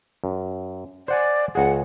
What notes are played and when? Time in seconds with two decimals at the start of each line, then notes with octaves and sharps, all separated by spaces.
0.24 F#2
1.08 C5 D5 F#5 G#5
1.55 C#2 G#4 F#5